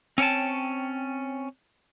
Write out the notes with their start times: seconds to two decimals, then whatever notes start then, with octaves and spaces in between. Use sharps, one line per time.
0.18 C4 C#4 C#5 G5 A5